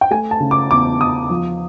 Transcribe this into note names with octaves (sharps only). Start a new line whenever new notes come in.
G5
A3 G#5
A5
C#3
D6
E2 D6
E2 D#6
F3